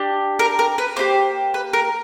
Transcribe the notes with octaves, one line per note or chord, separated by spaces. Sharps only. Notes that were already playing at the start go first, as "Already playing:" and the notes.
Already playing: D4 G4
A#4
A#4
B4
A#3 D#4 G4 C5
B4
A#4